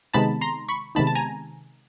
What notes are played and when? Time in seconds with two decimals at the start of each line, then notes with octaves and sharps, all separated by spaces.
0.14 C3 D#3 G#3 B3 D#4 A5 B5
0.41 A#5 C6
0.68 B5 C#6
0.95 C3 D#3 G#3 B3 D#4 A5 B5
1.07 A5
1.15 G#5 A#5